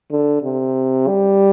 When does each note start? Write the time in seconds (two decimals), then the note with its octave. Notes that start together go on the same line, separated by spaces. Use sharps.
0.12 D3
0.43 C3
1.08 G3